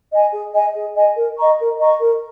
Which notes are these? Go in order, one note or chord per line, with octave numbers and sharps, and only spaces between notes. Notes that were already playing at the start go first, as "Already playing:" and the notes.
D#5 G#5
G#4
D#5 G#5
G#4
D#5 G#5
A#4
D#5 A#5 C#6
A#4
D#5 A#5 C#6
A#4